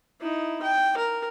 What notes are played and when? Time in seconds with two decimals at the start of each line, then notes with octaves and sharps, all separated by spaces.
0.21 D#4 E4
0.62 G5
0.97 A#4